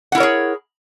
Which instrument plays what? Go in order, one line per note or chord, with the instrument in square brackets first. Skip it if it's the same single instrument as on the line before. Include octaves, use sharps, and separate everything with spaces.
[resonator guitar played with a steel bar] F#5
E4
A#4
C#5
G#4